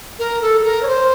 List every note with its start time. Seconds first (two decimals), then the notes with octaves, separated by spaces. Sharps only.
0.19 A#4
0.42 A4
0.61 A4
0.64 A#4
0.83 C#5
0.87 C5